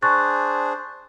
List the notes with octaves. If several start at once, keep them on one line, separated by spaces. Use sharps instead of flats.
D4 G#4 C5 C#6 F#6 A6